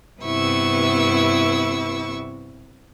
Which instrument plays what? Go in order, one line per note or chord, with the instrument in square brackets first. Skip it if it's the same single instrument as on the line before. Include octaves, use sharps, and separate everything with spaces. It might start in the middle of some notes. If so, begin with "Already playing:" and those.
[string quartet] G2 C3 B3 E4 C#6 E6